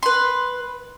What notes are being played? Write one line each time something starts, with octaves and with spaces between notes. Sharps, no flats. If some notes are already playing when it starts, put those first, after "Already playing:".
B4 C6